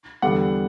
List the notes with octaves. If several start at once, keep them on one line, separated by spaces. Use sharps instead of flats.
E2 D3 G3 B3 F#5